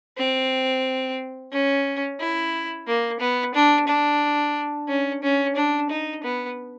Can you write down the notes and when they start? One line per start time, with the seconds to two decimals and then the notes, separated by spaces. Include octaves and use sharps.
0.17 C4
1.52 C#4
2.20 E4
2.87 A#3
3.20 B3
3.54 D4
3.87 D4
4.88 C#4
5.23 C#4
5.56 D4
5.90 D#4
6.23 B3